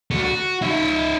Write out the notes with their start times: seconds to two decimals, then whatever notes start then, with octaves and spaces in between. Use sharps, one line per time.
0.11 A3 F#4
0.23 F#4
0.62 D#4 E5